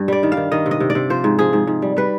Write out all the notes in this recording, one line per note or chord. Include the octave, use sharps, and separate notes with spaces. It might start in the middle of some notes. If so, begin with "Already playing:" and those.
Already playing: G2
G3 D5
D#3
F5
D#3
D#3 D#5
C3
D#5
C3
D5
C3
F3 C5
G#2
F3 G#4
G#2
G#2
G3
G3 B4